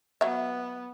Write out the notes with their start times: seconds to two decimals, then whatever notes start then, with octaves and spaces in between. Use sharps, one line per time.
0.21 F#3 B3 E5